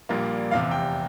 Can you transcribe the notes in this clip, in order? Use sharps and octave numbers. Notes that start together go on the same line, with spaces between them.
A#1 A#2 G3 A#3 F4
F1 E2 C3 F5
G5